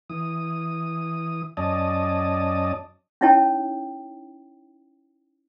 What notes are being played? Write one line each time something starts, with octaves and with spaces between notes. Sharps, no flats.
E3 D#6
F#2 C#4 D5 D#5 A5 D#6
C#4 D#4 E4 C#5 G5 A5